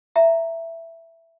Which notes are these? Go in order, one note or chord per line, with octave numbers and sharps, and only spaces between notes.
E5 A#5